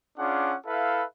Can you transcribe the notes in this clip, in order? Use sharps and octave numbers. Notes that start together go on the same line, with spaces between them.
C#4 D4 F4 G#4 F#5 D6
E4 A4 B4 E5 F5